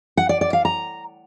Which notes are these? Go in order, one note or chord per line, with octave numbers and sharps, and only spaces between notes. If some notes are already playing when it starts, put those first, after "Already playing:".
F#5
D5
D5
F5
A#5